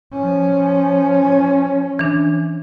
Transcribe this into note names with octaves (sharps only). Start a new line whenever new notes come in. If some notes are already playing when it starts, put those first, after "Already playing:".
F3 C#4
E3 D4